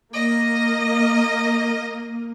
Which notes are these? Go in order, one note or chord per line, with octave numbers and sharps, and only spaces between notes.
A#3 D#5